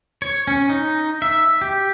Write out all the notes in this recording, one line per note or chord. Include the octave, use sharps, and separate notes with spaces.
C#5
C#4
D#4
E5
G4